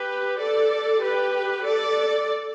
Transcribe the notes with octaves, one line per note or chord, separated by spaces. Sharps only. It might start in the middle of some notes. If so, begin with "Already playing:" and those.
Already playing: G4 B4
A4 D5
G4 B4
A4 D5